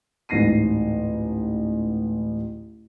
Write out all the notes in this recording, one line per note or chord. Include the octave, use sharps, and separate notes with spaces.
D1 A1 G#2 A#6 C7 D#7